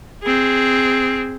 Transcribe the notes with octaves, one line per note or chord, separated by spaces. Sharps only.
C4 G#4